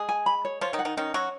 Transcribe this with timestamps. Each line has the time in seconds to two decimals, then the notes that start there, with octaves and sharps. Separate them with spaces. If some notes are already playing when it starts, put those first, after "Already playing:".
Already playing: G#3 G#4
0.09 G#5
0.26 B5
0.45 C#5
0.61 F3 F4 C#5
0.73 D#3 D#4
0.79 F#5
0.85 D#3 D#4
0.97 D#3 C#4 D#4
1.14 F#3 F#4 C#5